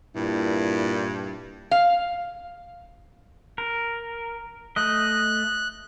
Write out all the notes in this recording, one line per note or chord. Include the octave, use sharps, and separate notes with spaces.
G2 A#2 E4
F5
A#4
A3 D#5 F#6